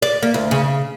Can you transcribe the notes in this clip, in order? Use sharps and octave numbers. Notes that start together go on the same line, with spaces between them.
D5
A#3
D2
C#3